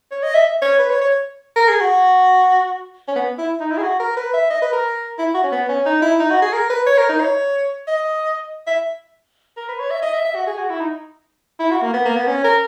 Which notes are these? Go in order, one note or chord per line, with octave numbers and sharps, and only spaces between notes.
C#5
D#5
E5
C#5
B4
C#5
C#5
A#4
G#4
F#4
C#4
B3
E4
D#4
E4
G#4
F#4
A#4
B4
E5
D#5
B4
A#4
E4
F#4
C#4
B3
C#4
D#4
E4
D#4
F#4
G#4
A#4
B4
C#5
A#4
D#4
C#5
D#5
E5
A#4
B4
C#5
E5
D#5
E5
E5
F#4
G#4
F#4
E4
D#4
E4
F#4
A#3
B3
A#3
B3
C#4
A#4